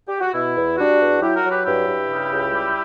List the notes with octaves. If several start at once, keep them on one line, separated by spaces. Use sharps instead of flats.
G4
F#4
B2 E4
E2
G3 D4 F#4
E2
F#3 E4 G4
F#4 A#4
F#3
G4 B4
G2 E4 G4
G2
C#3
C#2
G3